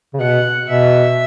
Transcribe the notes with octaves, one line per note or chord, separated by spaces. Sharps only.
C#3
B2 F#5
B2 E5